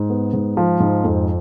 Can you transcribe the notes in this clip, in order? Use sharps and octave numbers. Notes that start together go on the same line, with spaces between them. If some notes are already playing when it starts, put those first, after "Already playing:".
Already playing: G#2
B3
G#2
F3
G#2
F2